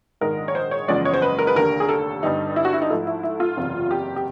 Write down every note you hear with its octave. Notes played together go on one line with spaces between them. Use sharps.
A#1 G#2 D#3 G#3 A#4
C#5
C5
C#5
F#1 E2 C#3 F3 G#3 D5
C#5
C5
B4
A#4
B4
F1 D#2 D3 A#4
G#4
A4
G1 G2 D3 G3 D#4
E4
F#4
E4
D#4
G#2 F3 A3 E4
E4
E4
F4
F#1 E2 C3
G4
G4